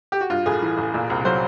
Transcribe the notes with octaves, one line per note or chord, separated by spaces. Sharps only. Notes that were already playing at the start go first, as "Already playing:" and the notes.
G4
F#4
G2 F4
A1 G#4
E3
A1
A#2
C2
F#3 C5